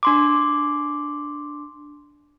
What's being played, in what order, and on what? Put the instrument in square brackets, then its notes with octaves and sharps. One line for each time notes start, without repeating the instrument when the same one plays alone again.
[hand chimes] D4 C6 D6